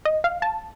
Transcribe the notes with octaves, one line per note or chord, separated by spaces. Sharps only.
D#5
F5
A5